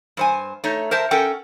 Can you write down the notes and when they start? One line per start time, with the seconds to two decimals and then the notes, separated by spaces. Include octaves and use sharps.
0.17 G2 C5 G#5
0.64 A3 D#4 C#5
0.91 A#4 C5 E5 A5
1.11 C#4 A4 A#4 F#5 G5